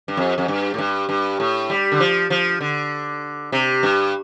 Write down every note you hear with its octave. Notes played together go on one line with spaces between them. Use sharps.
G2
F2
F2
G2
A2
G2
G2
A2
G3
D3
F3
F3
D3
C3
G2